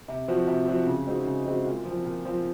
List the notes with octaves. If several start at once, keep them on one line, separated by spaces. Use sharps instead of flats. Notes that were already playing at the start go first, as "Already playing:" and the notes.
C3
F3 C4 F#4
C3
F3 C4 F#4
C#3
G#3 C4 D#4 F#4
C#3
G#3 C4 D#4 F#4
A#2
F3
C4
A#2
F3 C4